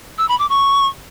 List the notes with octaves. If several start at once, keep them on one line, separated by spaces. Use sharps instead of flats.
E6
B5
D6
C#6